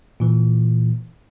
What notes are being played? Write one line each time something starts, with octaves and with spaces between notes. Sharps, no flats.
A#2 E3